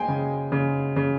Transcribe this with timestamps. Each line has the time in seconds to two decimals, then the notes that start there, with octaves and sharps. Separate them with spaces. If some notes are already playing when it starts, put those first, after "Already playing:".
Already playing: G#3 G5 G#5
0.08 C#3
0.52 C#3
0.96 C#3